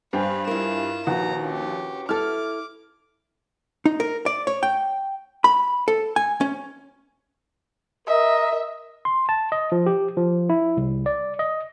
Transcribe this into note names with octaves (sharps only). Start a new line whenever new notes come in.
G2 B4 C5 F5 G5 G#5
E4 F4 A#4 E7
A#1 D#2 F#4 B4 F#5 A#5
C#4 G4
E4 A4 D6 F6
D#4
A#4
D5
C#5
G5
B5
A4
G#5
C#4
A#4 D#5 E5
C6
A5
D#5
F3
G4
F3
E4
C2
D5
D#5